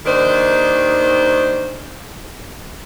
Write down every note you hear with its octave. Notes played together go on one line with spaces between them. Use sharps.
D#2 D#3 D4 C5